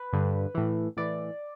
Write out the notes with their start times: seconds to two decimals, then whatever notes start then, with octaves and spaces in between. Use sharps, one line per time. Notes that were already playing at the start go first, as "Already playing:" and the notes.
Already playing: B4
0.13 G2 D3
0.55 A2 E3
0.97 A2 E3 D5